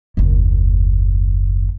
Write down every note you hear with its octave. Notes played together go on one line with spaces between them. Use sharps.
F#1 D#2